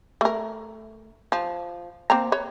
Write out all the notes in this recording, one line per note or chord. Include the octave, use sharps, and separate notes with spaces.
A3 A#4
F3
A#3 C4 A#5
B4 C#5